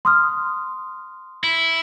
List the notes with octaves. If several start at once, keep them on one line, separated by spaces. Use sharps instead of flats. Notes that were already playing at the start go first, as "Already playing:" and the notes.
C6 D#6 F6
E4